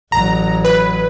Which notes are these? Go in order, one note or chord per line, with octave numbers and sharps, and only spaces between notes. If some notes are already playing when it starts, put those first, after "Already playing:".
A1 F#3 A#5
B4